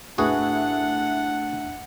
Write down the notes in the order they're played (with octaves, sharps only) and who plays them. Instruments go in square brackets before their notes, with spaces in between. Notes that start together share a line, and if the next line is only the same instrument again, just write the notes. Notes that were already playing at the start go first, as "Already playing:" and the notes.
[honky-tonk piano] A2 A3 E4 [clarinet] D4 [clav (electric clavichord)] F#4 G#4 B4 [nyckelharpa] F#5